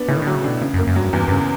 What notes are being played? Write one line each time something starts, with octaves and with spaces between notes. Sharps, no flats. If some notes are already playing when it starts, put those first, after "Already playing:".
Already playing: B3 D4
A2 C#3
D#3
D3 F#3
C#3
B2 D4
C#3
F#2
A#3
F#2
G2 F#3
E2 G2
G2 C#3